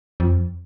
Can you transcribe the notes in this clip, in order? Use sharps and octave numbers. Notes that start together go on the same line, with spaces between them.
F2